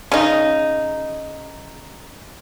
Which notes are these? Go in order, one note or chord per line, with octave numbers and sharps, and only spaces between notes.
C#3 D#4